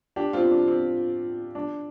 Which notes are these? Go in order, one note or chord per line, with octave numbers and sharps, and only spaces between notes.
D4 G4
C4 F4
D4
C4
D4